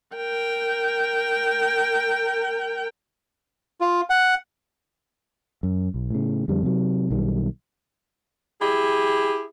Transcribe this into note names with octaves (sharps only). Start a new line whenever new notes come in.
A#4 G5
F4
F#5
F#2
B1
A2 C#3
F2 D3 G3
C3 F#3
B1 D#3 G3
E4 G4 G#4